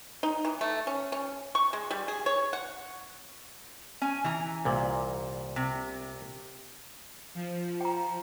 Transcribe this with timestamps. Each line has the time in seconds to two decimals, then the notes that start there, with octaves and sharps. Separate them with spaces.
0.23 D#4
0.45 E3
0.61 A3
0.87 C#4
1.12 C#4
1.55 C#6
1.73 G#3
1.91 G3
2.08 G#4
2.26 C#5
2.53 F#5
4.01 C#4 G#5
4.24 E3 A#5
4.65 C2 A#2
5.56 C3
7.35 F3
7.81 G5 A#5